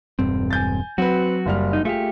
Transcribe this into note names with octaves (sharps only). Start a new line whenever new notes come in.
E1 G2 C4
G#5 G6 A6
F#3 C4 F#4 B4
F#1 G3 F6
D#4
A3 F4 G4 G#4